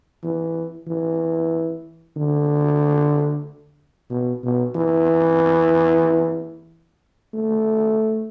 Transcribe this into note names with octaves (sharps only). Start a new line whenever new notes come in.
E3
E3
D3
B2
B2
E3
A3